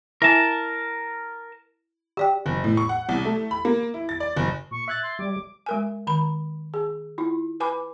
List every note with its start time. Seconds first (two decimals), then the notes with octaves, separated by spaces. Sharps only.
0.22 E4 A#4 E5 G#5 A5
2.17 G4 D5 G5
2.46 F#1
2.64 A2
2.77 C#6
2.89 F#5
3.09 C2
3.25 A3
3.51 B5
3.65 A#3
3.94 E4
4.09 A6
4.20 D5
4.37 F#1
4.71 A#2 C#6
4.88 E5 F#6 G#6 A6
5.03 C6
5.19 G3 D6
5.66 G#3 A#4 G#5
6.07 D#3 B5
6.74 G#4
7.18 E4 F4
7.60 B4 G#5 B5 D6